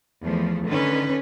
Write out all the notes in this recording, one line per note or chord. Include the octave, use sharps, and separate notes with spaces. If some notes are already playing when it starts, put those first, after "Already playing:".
E2 F3 A3
D3 D#3 C#4 B4